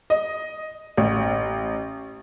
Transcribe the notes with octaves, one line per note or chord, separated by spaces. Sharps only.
D#5
A1